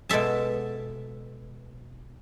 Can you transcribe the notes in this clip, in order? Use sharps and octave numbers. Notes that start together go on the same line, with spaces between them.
B2 G#3 A4 E5 A5